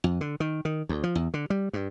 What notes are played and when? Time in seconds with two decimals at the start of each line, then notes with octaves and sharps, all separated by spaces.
0.04 F2
0.21 D3
0.40 D#3
0.65 D#3
0.89 D2
1.04 F3
1.15 E2
1.34 D3
1.50 G3
1.73 G2